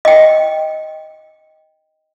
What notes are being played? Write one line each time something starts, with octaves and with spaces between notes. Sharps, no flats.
D#5 G5